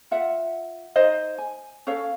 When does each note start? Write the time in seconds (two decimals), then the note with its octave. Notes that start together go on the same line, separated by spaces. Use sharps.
0.11 F4 E5 F#5
0.96 D#4 C5 D#5
1.38 G#5
1.87 C#4 A4 C#5 F5